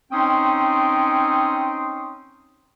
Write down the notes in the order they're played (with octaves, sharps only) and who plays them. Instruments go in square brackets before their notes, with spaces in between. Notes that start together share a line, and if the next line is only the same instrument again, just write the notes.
[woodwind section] C4 C#4 D#4 G5 C6 D#6